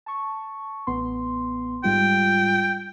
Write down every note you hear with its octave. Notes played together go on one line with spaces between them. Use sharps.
A5 C#6
A1 B3 C6
G#2 G3 F4 G5